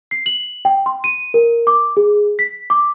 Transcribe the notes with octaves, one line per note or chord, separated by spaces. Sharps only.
C7
F#7
G5
C6
D#7
A#4
D6
G#4
B6
D6